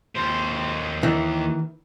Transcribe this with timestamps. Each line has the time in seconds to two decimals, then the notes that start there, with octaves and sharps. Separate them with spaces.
0.15 D#2 C5
1.03 D#3 E3